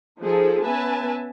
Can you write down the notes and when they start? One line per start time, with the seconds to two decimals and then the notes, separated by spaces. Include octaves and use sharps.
0.20 F3 D#4 G#4 A4
0.63 B3 C#4 B4 E5 G#5 A5